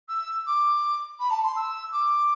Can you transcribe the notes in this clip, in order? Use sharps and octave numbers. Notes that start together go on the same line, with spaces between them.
E6
D6
B5
A5
C6
E6
D6